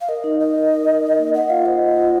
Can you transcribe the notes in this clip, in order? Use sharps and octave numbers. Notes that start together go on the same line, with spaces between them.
F5
A#4 D#5
D#4
A#4 D#5
A#4
A#4
D#4
D#4
A#3
D#5 F#5
F4 F5
C5 D#5
F#5
F4